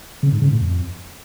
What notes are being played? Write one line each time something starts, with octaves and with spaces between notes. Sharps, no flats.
C#3
G#2
C#3
A2
F2